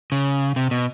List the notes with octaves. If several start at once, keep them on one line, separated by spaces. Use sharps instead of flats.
C#3
C3
B2